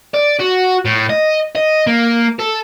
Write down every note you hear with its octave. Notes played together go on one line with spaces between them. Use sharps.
D5
F#4
A2
D#5
D#5
A#3
A4